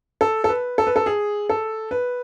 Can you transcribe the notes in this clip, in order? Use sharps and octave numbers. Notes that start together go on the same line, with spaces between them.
A4
A4
B4
A4
B4
A4
G#4
A4
B4